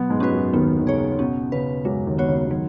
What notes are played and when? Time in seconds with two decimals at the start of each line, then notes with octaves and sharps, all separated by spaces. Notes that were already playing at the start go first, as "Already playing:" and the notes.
Already playing: B2 F#3 B3
0.10 G#2 G#3
0.20 G#3 C#4 F#4 B4
0.32 F#2 F#3
0.53 D#2 D#3 B3
0.79 D#3
0.86 C#3 G#4 C#5
1.19 B2 C#4
1.52 C#3 B4
1.85 F#2 F#3 G#3
2.06 D#2 D#3
2.18 B3 F#4 C#5
2.28 C#3
2.47 C#3
2.50 D#3 F#3